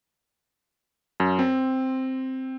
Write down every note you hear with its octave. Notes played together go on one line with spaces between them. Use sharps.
F#2
C4